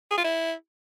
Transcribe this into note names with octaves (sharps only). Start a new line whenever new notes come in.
G#4
F4
E4